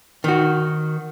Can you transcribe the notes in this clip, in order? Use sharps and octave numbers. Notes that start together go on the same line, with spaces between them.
D#3 F#4